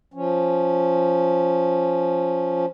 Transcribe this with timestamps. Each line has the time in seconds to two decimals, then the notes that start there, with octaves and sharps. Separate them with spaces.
0.14 F3 C#4